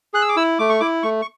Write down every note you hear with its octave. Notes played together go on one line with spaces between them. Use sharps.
G#4 F#6
E6
D6
E4 E6
A3 D6
C#6
E4 D6
A3 C#6
C#6